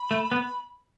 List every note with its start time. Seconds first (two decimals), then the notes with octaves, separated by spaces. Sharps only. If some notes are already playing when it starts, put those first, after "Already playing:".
Already playing: B5
0.11 A3
0.32 B3